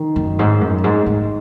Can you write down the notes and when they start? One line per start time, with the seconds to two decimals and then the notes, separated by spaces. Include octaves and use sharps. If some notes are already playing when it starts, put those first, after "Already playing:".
Already playing: D#3
0.16 F#2
0.39 G#2
0.61 F#2
0.84 G#2
1.06 G#2